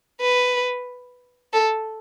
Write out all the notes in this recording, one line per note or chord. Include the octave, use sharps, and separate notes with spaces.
B4
A4